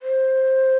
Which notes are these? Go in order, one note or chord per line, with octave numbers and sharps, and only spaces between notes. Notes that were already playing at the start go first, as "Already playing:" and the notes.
C5